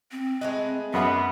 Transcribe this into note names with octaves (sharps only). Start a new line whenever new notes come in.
C4
G#3 A3 B4 D#5
F#2 B3 E5 F#5